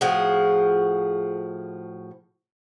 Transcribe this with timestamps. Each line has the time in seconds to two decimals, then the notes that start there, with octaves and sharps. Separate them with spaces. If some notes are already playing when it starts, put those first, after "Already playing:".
0.01 A2 F3 F#4 G#4